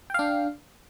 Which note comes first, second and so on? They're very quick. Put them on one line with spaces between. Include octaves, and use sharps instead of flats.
G5 F5 D4